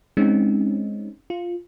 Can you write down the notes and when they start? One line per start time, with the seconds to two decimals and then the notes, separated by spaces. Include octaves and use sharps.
0.17 G#3 C4 C#4 D#4
1.30 F4